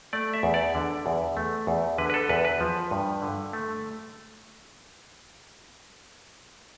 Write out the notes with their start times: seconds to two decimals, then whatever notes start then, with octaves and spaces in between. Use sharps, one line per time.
0.13 A3 D5
0.34 E5
0.43 E2
0.54 D5
0.75 D3
1.06 E2
1.37 A3
1.67 E2
1.98 D3 B4
2.10 B4
2.14 A4
2.29 E2 B4
2.45 B4
2.61 F3
2.91 G2
3.22 D3
3.53 A3